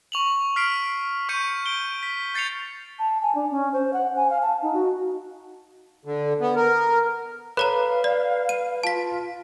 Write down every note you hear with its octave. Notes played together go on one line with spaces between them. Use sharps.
C#6 F7 F#7
F6 B6 C7 D7
C#6 G6 C#7 D#7
D7 G7
B6
G6 A6 C7 C#7 F7
A5
G#5
D4
C#4
C5
F#5
G#5
F5
A5
D#4
F#4
D3
B3
A#4
A4 B4 C#5 F5 A#5
D5
D#7
F4 A5 B6